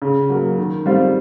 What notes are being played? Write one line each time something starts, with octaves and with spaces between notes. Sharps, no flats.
C#3
F#3 A#3
D#3
G3 C4 F4